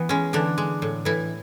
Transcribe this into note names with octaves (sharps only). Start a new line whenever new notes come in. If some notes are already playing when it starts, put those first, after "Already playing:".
Already playing: E3 B3
G#3 C#4
D3 E3 D4
G#3
A2
A2 E3 E4